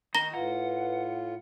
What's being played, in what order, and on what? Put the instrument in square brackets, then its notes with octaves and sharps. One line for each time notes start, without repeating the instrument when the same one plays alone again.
[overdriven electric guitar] D#3 [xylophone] A#5 A#6 G7
[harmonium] A2 F4 [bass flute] B4 [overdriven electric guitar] F#5